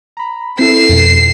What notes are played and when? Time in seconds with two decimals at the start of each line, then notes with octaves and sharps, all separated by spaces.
0.17 A#5 B5
0.59 C4 E4 A4 C7 E7
0.89 F2 B2